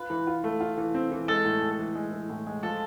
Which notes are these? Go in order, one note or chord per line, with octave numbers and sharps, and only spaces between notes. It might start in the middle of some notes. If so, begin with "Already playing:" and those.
Already playing: F4 B4
E3
F4
A3
F4
E3
C4
E3
G#3 A4
A2
G#3
E3
G#3
E3
A2
G#3
F3 A4